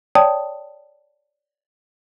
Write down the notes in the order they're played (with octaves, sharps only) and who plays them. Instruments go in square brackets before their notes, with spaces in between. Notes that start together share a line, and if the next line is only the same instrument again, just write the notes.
[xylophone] C#5 D5 G5 A5 D#6